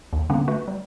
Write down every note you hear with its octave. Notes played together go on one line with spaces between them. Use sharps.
D#2
D3 G3 A#3 B3 C#4 D4
A3 F#4 B4
G3